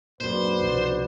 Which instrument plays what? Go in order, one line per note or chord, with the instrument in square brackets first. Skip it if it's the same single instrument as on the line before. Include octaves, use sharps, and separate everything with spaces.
[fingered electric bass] F#2 A#2 [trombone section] D4 F#4 B4 [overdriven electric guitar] C5
[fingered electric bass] C2 F2 B2